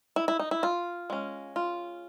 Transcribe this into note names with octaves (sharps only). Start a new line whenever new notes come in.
E4
E4
D#4
E4
F4
G#3 C#4
F4